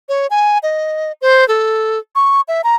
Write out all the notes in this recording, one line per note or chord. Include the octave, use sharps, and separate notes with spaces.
C#5
G#5
D#5
C5
A4
C#6
E5
A#5